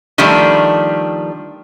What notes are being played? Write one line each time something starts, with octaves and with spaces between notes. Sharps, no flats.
D#3 F3 G3 A3 D4